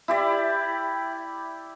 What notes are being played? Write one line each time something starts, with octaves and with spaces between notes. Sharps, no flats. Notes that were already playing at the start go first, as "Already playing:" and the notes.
E4 G4 D5